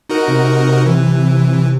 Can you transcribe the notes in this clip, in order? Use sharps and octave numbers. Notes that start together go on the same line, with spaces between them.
D#4 F#4 A#4
C3
E3